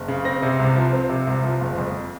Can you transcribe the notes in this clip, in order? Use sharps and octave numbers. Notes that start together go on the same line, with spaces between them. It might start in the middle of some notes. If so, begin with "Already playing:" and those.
Already playing: F#1
C#3
C4 A#6
C3
C2
F3
C4
C3
C2
F3
F#1
F2